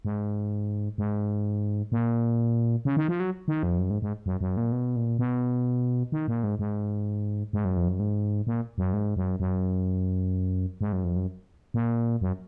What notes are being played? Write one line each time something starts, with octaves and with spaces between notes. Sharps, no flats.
G#2
G#2
A#2
C#3
D#3
F3
F#3
D#3
F2
F#2
G#2
G#2
F#2
F#2
A#2
B2
A#2
B2
D#3
A#2
G#2
G#2
G#2
F#2
F2
F#2
G#2
A#2
F#2
G#2
F#2
F#2
G#2
F#2
F2
F#2
A#2
F#2